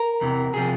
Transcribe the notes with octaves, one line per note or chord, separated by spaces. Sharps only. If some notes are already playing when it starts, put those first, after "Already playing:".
Already playing: A#4
E2 C3 E3
C3 F3 G#4